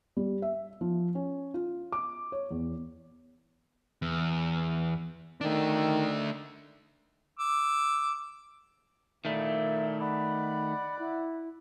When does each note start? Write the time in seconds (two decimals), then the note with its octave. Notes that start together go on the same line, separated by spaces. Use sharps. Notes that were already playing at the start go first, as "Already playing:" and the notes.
0.17 G3
0.42 E5
0.81 F3
1.15 C#4
1.54 F4
1.92 D6
2.32 C#5
2.50 E2
4.02 E2
5.41 D#3 A3 D4
7.39 D6 E6
9.25 A#2 D#3 A3 E4 E5
10.00 D5 F#5 B5
10.99 E4